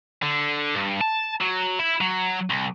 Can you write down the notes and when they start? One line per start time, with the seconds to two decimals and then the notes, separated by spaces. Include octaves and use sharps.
0.22 D3
0.75 G2
1.01 A5
1.41 F#3
1.79 E4
2.01 F#3
2.50 C2